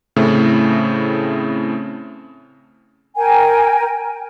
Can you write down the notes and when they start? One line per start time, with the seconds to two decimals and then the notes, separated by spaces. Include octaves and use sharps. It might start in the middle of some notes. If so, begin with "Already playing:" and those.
0.16 A2 C#3 A3 C4 E4
3.16 A#4 G5 G#5